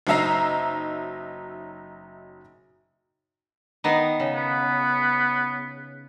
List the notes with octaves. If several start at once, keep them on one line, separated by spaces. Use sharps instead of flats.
F#1 F#3 D#4 E5 A#5 C7
D#3 B3 D#4
C#3
B3